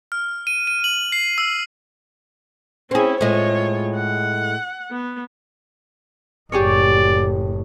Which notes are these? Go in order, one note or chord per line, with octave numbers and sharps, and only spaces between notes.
F6
D#7
D#7
F#7
C7
E6
C4 C#4 E4 G#4
A2 G#3 F4 C#5
F#5
B3
F#1 A2 G4 G#4 C#5 D5